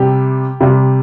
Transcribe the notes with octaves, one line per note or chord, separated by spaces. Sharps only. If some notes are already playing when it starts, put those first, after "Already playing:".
Already playing: C3 G3 G4
C3 G3